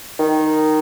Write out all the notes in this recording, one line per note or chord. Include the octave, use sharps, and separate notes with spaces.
D#3